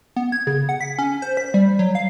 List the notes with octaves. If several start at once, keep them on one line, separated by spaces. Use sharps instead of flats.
B3
G#6
C#3
F#5
B6
C#4
C5
B6
G3
F#3
F5